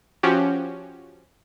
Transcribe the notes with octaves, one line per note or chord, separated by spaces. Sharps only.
F3 C#4 F#4 G4